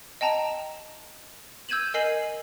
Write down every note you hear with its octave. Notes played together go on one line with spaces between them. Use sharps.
D#5 G5 A5 A#5
E6 G6 G#6 D#7 E7 F#7
A#4 D#5 G#5 C7 D#7 F#7